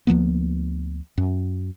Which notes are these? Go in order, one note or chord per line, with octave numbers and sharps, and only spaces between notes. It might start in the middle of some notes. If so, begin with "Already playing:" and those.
D2 F3 A#3 B3
F#2